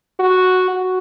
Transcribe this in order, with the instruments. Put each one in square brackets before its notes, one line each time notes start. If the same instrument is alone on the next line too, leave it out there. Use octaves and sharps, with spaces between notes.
[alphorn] F#4
F#4